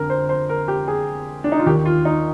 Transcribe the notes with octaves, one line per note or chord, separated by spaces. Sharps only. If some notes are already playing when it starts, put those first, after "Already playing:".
Already playing: F2 D3 A#4
C5
C5
A#4
G4
G#4
D4
D#4
F4
D#2 D#3 G4
F4
D#4